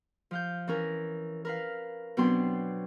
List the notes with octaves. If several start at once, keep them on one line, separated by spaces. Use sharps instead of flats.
F3 F5 G6
E3 C#4 A#4
A#4 B4 F5
B2 F#3 B3 C4 D4 C6